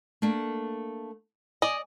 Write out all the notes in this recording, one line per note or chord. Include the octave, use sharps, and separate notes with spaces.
A3 A#3 D4
D5 D#5 G#5